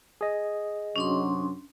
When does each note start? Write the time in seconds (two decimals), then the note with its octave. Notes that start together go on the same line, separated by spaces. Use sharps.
0.21 G#4 D#5
0.96 F#2 C3 F#3 C#4 D4 C6